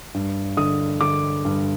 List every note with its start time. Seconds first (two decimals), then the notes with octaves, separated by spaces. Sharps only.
0.14 G2
0.57 D3 D#6
1.01 D3 D6
1.45 G2